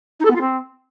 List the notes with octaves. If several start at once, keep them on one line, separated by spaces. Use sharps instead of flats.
D#4
A4
B3
F4
C4